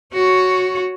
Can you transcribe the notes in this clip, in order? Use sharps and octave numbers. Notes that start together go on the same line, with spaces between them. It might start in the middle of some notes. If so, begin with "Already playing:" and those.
F#4 C#5